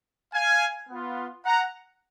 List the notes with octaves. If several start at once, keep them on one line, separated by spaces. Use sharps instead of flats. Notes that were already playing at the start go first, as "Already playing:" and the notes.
F5 G#5
B3 F4
F#5 A#5